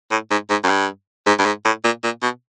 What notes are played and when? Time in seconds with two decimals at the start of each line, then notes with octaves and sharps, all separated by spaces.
0.11 A2
0.30 G#2
0.50 G#2
0.63 F#2
0.69 G2
1.26 G#2
1.39 G2
1.45 G#2
1.65 A2
1.84 A#2
2.04 A#2
2.22 B2